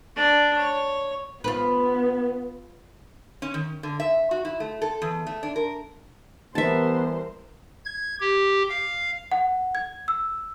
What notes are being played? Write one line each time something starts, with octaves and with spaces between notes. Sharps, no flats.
D4 D5
C#5
B3 F4 B4
C#4
D#3
D3
E5
F#4
E4
A3
A4
E2
A3
D4
A#4
E3 G3 B3 A#4 C5 E5 A5
G#6
G4
F5
F#5
G#6
E6